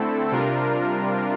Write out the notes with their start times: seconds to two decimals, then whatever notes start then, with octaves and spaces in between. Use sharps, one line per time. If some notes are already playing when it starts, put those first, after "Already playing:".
Already playing: D3 A3 C4 E4 A4
0.32 C3 G3 D4 F4 A#4